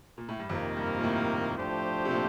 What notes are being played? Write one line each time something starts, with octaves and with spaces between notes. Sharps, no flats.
A#2
A2
G2
F2 C3 D#3 A#3
G2
A#2
A2
F3 A3 D4 G4 C5
C3
A#2